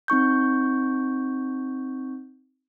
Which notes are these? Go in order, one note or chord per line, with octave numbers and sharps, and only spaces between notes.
C4 D#4 C#6 G6